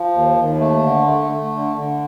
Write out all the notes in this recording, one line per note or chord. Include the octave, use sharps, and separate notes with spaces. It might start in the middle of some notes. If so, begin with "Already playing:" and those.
Already playing: F3
D#2
D#2
A3
D3
A3
A3
D3
D3